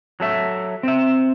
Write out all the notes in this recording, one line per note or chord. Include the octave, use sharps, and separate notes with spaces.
F#3 A4 E5
C4 E5